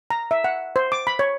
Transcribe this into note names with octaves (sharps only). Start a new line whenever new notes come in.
A#5
E5
F#5
C5
D6
B5
C#5